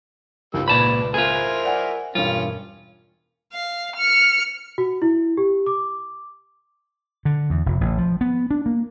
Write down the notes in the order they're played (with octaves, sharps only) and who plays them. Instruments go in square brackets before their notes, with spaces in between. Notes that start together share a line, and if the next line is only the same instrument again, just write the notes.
[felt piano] C#2 G#2 [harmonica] G3 A#3 E6
[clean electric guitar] A#2 A5 B5 [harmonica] B4 D5
[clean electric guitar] F4 G#4 [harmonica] A#4 C5 E5
[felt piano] D5 F#5 G#5
[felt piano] E1 G2 [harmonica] C#4 [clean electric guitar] F4
[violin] F5
F6 C#7
[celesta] F#4
E4
G4
D6
[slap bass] D3
E2
F1
A1
F3
B3
D4
A#3